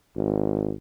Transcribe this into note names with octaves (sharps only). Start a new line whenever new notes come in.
G#1